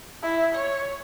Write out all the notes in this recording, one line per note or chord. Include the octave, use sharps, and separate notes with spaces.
E4
C#5